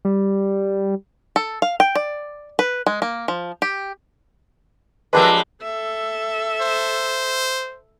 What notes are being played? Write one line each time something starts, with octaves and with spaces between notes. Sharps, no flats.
G3
A4
F5
G5
D5
B4
G#3
A#3
F3
G4
F3 G#3 A#3 D4 G4 B4
A4 E5
C5